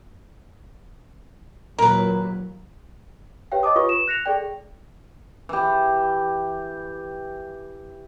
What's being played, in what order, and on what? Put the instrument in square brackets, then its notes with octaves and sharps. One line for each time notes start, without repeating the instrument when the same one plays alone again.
[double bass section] D#2 A#2 F#3 [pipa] A#4 B4
[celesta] G4 B4 C#5 F5 G5
C#5 D#5 A5 D6 D#6
F4 G4 B4 C#6 D#6
E7
F#6 A#6 C#7 F7
G#4 A4 D5 G5
[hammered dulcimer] E3 G4